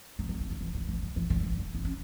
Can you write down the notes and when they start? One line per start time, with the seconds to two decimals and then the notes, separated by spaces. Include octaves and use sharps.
0.19 F#3
0.29 F#3
0.40 D3
0.50 D3
0.61 E3
0.74 D3
0.88 E3
1.02 F#3
1.16 E3
1.30 D3
1.43 F#3
1.53 G3
1.75 B3
1.85 C#4